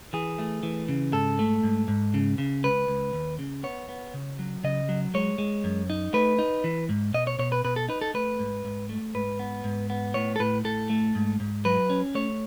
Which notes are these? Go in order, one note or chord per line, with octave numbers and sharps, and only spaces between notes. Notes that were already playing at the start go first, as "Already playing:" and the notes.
E3 G#4
A3
E3
C#3
G#2 A4
A3
G#2
G#2
C#3
C#3
C#2 B4
C#2
D#2
C#3
B3 C#5
B3
C#3
F#3
C#3 D#5
F#3
G#3 C#5
G#3
F#2
D#4
A3 B4
D#4
E3
G#2
B2 D#5
C#5
B2 C#5
B4
B2 B4
A4
D#4 B4
A4
A3 B4
G#2
G#2
A3
G#2 B4
B3
G#2
B3
A2 C#5
A4
A2 B4
A2 A4
A3
G#2
G#2
F#3 B4
C#4
A3 C#5